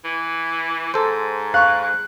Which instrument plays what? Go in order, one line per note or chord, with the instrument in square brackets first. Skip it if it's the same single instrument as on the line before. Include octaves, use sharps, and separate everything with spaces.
[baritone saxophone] E3
[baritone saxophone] G#2 [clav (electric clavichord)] A4 C5
[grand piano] F5 C#6 [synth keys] F#6